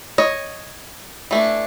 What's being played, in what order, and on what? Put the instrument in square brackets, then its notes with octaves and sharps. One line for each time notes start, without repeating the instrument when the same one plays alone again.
[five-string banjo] C#5 D#5
E3 A3 D4